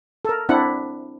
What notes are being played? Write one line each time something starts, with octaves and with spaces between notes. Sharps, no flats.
A4 A#4
C4 D4 E4 F#5